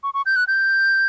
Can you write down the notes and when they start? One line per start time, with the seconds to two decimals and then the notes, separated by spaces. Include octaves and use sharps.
0.03 C#6
0.14 C#6
0.26 G6
0.36 F#6
0.48 G6